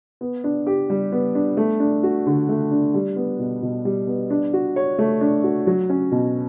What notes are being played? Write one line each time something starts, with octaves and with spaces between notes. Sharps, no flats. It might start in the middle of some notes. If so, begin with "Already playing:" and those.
B3
D4
G4
G3
B3
D4
A3
D4
F#4
D3
A3
D4
G3
B3
B2
B2
G3
B3
D4
F#4
C#5
A3
D4
F#4
F#3
C#4
B2